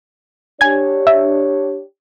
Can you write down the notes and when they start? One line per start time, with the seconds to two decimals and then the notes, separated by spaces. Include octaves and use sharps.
0.61 D4 G4 C#5 G#5 G#6
1.07 E5